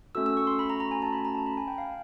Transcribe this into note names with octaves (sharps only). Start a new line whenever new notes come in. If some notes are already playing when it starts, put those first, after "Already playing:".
A3 C#4 F#4 A4 E6
E6
C#6
C6
B5
A#5
A#5
G#5
A5
B5
A#5
A5
B5
G#5
G5
F5